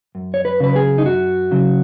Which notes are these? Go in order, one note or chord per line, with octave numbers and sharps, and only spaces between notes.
F#2
C#5
B4
C#3 F#3 B4
G#4
D#4
F#2 F#4
C#3 F#3